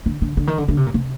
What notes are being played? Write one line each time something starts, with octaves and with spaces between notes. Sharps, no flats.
D3
D3
D3
D#3
D3
D3
C3
A#2
C3